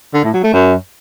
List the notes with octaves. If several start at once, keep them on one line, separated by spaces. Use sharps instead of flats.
D3
A2
F#3
A3
F#2